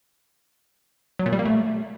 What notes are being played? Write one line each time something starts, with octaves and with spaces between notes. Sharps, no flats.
F#3
A#2
G3
A#3
A3